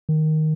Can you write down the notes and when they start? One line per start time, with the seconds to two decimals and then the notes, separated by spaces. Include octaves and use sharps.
0.09 D#3